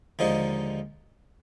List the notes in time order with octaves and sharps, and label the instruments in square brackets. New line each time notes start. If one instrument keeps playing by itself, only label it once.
[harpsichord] D#2 D3 F3 G#3 D#4